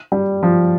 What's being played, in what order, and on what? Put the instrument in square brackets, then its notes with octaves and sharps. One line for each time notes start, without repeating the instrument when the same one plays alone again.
[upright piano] G3
F3